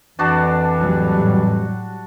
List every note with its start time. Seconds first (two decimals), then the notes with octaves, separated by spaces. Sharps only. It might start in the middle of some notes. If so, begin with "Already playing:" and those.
0.19 F2 E3 D4 F#4 A5
0.78 A2 F#3 G3